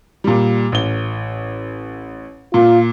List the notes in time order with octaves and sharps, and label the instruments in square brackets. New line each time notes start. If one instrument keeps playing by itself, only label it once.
[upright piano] A#2 G3
A1 G7
[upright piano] A#2 [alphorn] F4